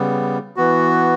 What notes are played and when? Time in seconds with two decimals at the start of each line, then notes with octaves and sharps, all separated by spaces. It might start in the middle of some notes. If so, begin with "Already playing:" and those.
Already playing: C#3 G3 B3
0.56 E3 B3 F#4